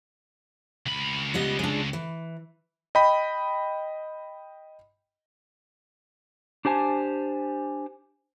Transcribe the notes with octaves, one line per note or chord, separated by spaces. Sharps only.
C#2 B5
G3 B3 D#5
G#3 D4
E3
D#5 G5 B5
D4 G4 C5 G#5 A5